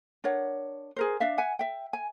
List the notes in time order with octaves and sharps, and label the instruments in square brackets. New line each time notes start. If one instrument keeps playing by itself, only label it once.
[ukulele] D4 A#4 C#5 F#5
G#4 A#4 C5
D4 D5 E5 F5
E5 F#5 G#5
E5 G5
G#5